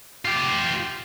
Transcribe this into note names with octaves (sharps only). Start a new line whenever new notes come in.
F4 G4